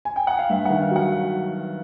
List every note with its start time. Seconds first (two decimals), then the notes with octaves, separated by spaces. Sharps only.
0.05 G#5
0.16 G5
0.27 F#5
0.39 F5
0.50 G2 E5
0.65 D#3 F#5
0.80 F5
0.91 F#3 F#5